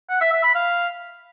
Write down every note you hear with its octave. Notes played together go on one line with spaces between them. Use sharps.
F#5
E5
E5
B5
F5